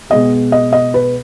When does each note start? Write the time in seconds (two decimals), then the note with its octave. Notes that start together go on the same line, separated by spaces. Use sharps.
0.10 B2 G#3 B3 D#5
0.52 D#5
0.73 D#5
0.94 B4